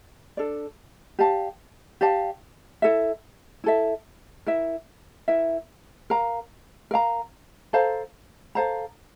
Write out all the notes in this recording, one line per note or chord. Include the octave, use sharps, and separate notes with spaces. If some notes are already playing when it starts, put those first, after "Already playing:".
D4 A4 D5
G4 D5 F5 A5
G4 D5 F5 A5
E4 A4 E5
E4 A4 E5
E4 A#4 E5
E4 A#4 E5
A#4 F5 A#5
A#4 F5 A#5
A4 C5 F5 A#5
A4 C5 F5 A#5